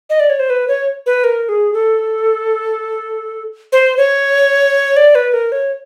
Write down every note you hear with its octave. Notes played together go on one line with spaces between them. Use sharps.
D#5
D5
C#5
C5
B4
C#5
B4
A#4
G#4
A4
C5
C#5
D5
B4
A#4
C#5